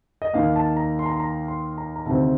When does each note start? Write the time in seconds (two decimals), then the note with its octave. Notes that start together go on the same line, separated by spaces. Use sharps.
0.22 D#5
0.34 D#2 D#3 A#3 F5
0.56 A5
0.77 A#5
0.99 C6
1.06 A#5
1.13 C6
1.20 A#5
1.48 C6
1.78 A#5
1.96 A#5
2.06 D2 C3 D#3 G3 C4 A5